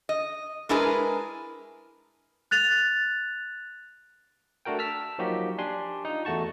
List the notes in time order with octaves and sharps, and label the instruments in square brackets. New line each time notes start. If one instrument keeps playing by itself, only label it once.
[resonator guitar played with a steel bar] D#5
G#3 D4 E4 G#4 A#4 B4
[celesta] F#6 A6 F7
[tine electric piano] A3 D4 F#4 A#4 G5
A5 E6 F6 B6
F3 F#3 A#3 D#4 F#4 G4
D4 G4 G#5 C6
D#4 F4
E2 A3 F#4 A5 C#6